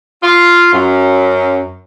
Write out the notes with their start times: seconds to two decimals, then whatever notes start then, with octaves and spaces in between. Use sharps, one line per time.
0.23 F4
0.73 F#2